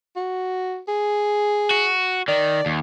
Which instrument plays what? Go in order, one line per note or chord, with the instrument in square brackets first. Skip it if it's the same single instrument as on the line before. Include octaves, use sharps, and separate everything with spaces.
[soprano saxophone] F#4
G#4
[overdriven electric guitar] F#4
[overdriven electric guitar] D#3 [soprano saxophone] D5
[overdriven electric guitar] D#2